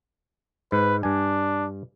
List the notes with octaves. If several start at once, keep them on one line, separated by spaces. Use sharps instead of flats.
G#2 B4
G2 D4 G#5